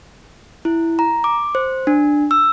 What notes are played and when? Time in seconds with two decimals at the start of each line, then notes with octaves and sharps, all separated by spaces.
0.65 E4
0.99 A#5
1.24 D6
1.55 C5
1.87 D4
2.31 E6